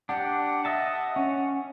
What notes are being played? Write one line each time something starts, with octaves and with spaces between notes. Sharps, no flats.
D4 G4 F#5
D#5 E5 A5
C#4